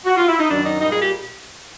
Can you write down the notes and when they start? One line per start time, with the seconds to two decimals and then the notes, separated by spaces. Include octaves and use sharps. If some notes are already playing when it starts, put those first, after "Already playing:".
0.06 F#4
0.17 F4
0.28 E4
0.39 D#4
0.49 F#2 D#3 F#3 D4
0.66 D#4
0.80 A#2 G3 D#4
0.90 G#4
1.00 G4